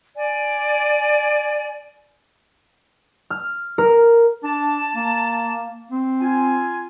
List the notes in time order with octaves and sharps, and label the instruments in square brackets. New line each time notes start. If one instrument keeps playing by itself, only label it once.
[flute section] D5 G#5
[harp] F6
A#4
[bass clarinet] D4 [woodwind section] A5
[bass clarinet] A#3
C4
[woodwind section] F4 G#5